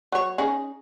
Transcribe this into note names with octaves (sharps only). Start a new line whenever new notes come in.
F#3 C#5
C#4 D#4 G#4